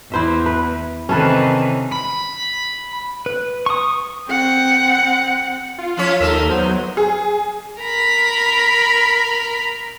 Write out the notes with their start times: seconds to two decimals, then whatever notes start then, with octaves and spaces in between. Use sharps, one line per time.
0.12 E2 E4 C5 E5
0.46 B4
1.09 C3 D#3 E3 C#4 A4 B4
1.92 B5
3.26 B4
3.66 C#6 D#6
4.27 C4 F#5
5.78 F4
5.97 F3 C#4 C#5
6.21 D#2 D#4 A4 A#4 E5
6.49 F#3 B3 C5
6.97 G#4
7.81 A#4 B5